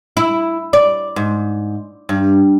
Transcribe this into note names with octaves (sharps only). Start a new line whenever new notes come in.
E4
D5
G#2
G2